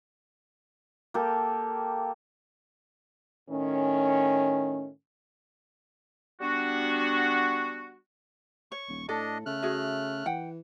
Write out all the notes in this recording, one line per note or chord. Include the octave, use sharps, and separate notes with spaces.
A#3 G4 A4
A2 D#3 C#4
G3 B3 D4 F#4
C#5 C#6
D#1
A2 D4 A4 D#5
C#3 A3 F6 F#6
F#4 G#4 E5
E3 F#5 G5